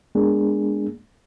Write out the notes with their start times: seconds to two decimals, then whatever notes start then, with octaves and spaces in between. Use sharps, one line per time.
0.15 G#3 A#3 B3 D4 G#4